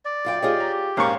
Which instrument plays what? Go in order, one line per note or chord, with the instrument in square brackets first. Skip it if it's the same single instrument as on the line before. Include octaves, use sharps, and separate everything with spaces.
[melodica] D5
[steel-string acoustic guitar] F#2 F4 G5
[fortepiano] D#4 [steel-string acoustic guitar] F4 G#4 C#5 [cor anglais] G4
[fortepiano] A#5
[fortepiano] A#1 G#2 C#6 [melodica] A#3 C#4 F5 [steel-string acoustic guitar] C5